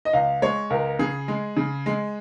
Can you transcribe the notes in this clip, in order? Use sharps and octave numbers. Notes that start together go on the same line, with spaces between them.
D#5
C#2 F5
G#3 C#5
C#2 A#4
C#3 G#4
G#3
C#3
G#3